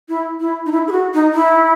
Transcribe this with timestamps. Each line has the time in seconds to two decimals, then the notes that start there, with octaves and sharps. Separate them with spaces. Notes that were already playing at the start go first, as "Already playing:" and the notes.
0.09 E4
0.40 E4
0.66 D#4
0.72 E4
0.88 G#4
0.92 F#4
1.14 D#4
1.34 E4